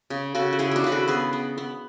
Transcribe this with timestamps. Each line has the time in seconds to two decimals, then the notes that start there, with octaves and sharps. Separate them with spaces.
0.10 C#3
0.35 C#3 F#4 A4
0.53 F#4
0.59 C#3 E4 G#4
0.71 D4 F#4 G#4
0.84 C#3 B4
0.92 F#4 A4
1.08 B3 G#4 B4
1.33 B3
1.58 B3